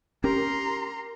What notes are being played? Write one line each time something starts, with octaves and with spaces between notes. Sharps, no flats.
C#4 G4 A#4 A#5 C6